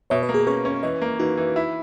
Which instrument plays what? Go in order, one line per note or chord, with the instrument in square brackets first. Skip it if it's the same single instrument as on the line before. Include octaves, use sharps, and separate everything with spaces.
[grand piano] B2 [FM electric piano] C#5 E5
[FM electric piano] B4 D#5
[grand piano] A#3
[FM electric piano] G#4 B4
[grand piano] C#4 [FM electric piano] G#4 B4
[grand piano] C#4
[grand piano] E3 [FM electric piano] B4 D#5
[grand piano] A#3
[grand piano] E3 [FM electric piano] D#4 F#4
[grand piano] E3
E4